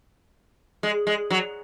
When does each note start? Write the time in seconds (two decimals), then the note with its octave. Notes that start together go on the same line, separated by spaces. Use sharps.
0.83 G#3
1.07 G#3
1.31 F#3